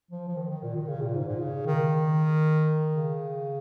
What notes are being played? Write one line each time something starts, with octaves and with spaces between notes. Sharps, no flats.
F3
F3
D#3
D#3
A#2
D#3
C#3
A#2
G#2
A#2
C#3
D#3
C#3